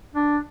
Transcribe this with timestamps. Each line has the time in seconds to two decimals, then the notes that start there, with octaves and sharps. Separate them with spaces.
0.15 D4